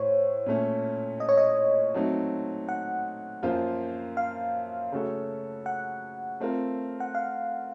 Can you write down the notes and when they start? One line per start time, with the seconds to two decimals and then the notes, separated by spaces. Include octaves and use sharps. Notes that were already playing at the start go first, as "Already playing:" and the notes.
Already playing: A2 C5 C#5
0.46 A#2 A3 C#4
1.20 D#5
1.29 C#5
1.37 D#5
1.94 F#3 A3 C4 D#4
2.69 F#5
3.43 F#2 F3 A#3 F4 C5
4.17 F5
4.92 C#3 A3 C#4 F#4 A4
5.66 F#5
6.40 A3 C4 F4 A#4
7.00 F#5
7.15 F5